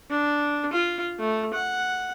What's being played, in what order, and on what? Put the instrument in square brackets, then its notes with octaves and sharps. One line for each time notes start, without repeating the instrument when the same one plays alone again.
[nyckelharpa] D4
F4
A3
F#5